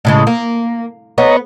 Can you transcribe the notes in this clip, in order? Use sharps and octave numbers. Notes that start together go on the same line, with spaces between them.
A2 C#3 G#3
A#3
B3 C#5 D#5 A#5